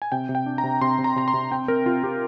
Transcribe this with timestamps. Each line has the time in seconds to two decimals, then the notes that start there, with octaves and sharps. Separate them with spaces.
0.02 G#5
0.12 C3 G5
0.29 C3
0.35 G5
0.46 D4
0.58 A#5
0.64 C3
0.81 C3 C6
0.98 C3
1.04 A#5
1.16 C3 A#5
1.28 C6
1.34 C3
1.51 C4 G5
1.68 C4 A#4
1.86 C3 F4
2.03 C4 G4